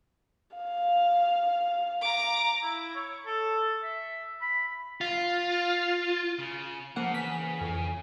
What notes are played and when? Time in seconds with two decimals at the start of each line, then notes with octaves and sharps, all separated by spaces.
0.56 F5
2.02 A#5 D6
2.63 E4
2.95 C#5
3.26 A4
3.83 E5
4.41 B5
5.01 F4
6.39 C#3
6.96 C#3 F3 A#3 F#5
7.14 E3 B6
7.61 F2